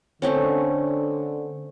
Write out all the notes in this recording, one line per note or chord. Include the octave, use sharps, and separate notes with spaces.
D3 A3 C4 C#4